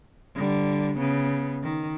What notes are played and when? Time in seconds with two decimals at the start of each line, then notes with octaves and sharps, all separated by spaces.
0.35 D3 G3
0.98 C#3 B3
1.63 D#3